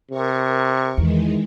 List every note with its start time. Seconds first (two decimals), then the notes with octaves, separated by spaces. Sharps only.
0.10 C3 A#4 C#6
0.97 E2 D#3 E3 G#3